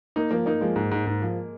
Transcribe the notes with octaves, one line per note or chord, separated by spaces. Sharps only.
A#3 D#4
F3 A#3
A#3 D#4
F3 G#3
G#2
G#2
G#2
F3